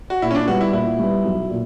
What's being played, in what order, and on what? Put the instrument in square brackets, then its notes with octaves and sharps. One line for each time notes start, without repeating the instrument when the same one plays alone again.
[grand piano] F#4
[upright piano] A#2 [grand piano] E4
[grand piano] C#4
D4
[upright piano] G3 B3 [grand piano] F#4
[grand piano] E4
[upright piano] A#2 [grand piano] E4
[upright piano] G3 B3
B1
A#2